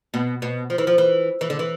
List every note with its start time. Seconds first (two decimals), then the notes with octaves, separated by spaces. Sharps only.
0.14 B2
0.42 B2
0.70 F3
0.78 E3
0.87 F3
0.98 E3
1.41 E3
1.50 D3
1.59 E3